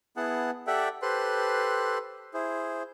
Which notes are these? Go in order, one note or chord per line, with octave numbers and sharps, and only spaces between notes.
B3 E4 G#4 F#5 A5
G4 A4 D5 E5 F#5 G5
G4 A4 B4 C5 C6 F#6
E4 G#4 C5